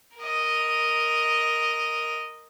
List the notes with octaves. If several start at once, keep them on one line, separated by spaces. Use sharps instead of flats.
A#4 D#5